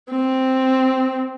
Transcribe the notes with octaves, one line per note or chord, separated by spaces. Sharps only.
C4